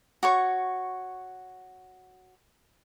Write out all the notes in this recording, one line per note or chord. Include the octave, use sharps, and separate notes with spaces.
F#4 C#5 C#6